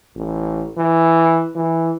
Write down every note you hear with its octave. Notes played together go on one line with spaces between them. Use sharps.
A1
E3
E3